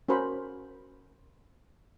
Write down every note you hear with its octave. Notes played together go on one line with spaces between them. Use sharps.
C#4 F#4 A#4 C5 B5